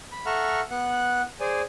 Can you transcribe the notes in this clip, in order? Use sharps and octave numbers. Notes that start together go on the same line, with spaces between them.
B5
A4 E5 F#5 A#5 C#6 F6
B3 F#5 F#6
G#4 C5 D5 G#5